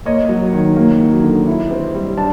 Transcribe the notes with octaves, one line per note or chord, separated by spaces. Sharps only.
A#3 C#5 D#5
F#3
D#3
A#3
F#3
D3
E4
C4
G3
D4 A5